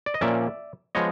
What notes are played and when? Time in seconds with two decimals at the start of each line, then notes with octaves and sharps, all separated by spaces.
0.06 D5
0.14 D#5
0.21 A#2 F3 A#3 C#4 D5 E5
0.95 F3 G#3 B3 C#5 D#5